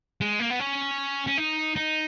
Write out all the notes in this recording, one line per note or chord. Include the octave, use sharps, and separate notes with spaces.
G#3
A#3
B3
C#4
C#4
D#4
D#4